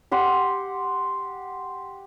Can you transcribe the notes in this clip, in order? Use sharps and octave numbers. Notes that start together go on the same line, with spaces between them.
G4 F#5 C6